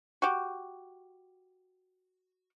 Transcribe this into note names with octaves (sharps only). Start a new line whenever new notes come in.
F#4 G4